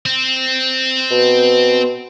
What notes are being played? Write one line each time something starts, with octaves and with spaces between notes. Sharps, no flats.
C4
B2